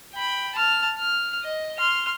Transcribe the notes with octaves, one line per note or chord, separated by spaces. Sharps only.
G5 B5
A5 F6
F6
D#5
C6 F6